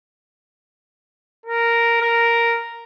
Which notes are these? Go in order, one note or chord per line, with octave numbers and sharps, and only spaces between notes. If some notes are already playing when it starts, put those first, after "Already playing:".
A#4
A#4